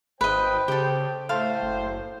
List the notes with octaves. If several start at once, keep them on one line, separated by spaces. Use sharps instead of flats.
G#1 B4 C5 D#5 G5
C#3 G4 A4
A2 A3 C5 F5 A5 C6
F#1